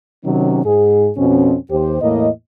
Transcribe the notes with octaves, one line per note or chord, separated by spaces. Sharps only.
C3 D#3 F#3 C#4
G#2 G#4
F2 B2 C4 C#4
D#2 G4 C5
E2 A2 A#3 D#5